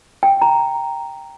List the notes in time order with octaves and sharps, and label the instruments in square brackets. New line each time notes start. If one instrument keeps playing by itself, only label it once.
[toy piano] G5
A#5